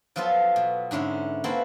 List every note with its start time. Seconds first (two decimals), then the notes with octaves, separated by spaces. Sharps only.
0.16 F3 F#3 B3 F4 A4
0.56 B2
0.91 G#2 D3 C#4 E4
1.44 A#3 C4 E4 F#4 A4 B4